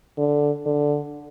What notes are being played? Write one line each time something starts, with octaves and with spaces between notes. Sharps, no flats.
D3
D3